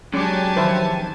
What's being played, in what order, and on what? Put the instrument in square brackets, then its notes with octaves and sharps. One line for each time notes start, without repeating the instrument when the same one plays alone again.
[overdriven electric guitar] F#3 [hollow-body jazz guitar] G#3 D4 [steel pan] C#4 D6 [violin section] G4 G#5 A5
[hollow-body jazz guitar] F2 D#3 E3 [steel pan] B4 C5 E5